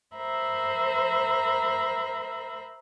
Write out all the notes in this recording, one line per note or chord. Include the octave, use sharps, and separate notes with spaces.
A#4 C5 E5 A#5 B5